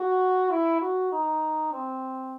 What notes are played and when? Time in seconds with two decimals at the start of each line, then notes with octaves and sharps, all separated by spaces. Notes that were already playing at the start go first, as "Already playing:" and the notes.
Already playing: F#4
0.51 E4
0.81 F#4
1.12 D#4
1.72 C4